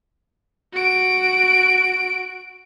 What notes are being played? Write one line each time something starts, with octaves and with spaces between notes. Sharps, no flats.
F#4 D7